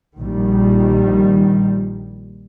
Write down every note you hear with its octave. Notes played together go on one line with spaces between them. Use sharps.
A#1 D#3 G3